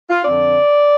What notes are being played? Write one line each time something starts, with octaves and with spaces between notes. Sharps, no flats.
F4
F2 D3 F3 C4 D5